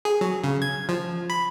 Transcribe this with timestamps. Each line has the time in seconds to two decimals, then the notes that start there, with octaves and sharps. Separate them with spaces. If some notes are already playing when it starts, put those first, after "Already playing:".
0.05 G#4
0.21 F#3
0.44 C#3
0.62 G#6
0.89 F3
1.30 B5